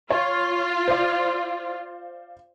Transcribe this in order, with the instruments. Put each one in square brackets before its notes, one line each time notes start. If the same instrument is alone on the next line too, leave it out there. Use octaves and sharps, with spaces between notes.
[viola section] F4 [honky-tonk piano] C#5
[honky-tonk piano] C5 D5 F5